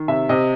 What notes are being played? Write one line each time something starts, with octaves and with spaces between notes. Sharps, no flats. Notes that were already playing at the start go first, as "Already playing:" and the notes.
Already playing: D#3
C3 E5
C3 D#5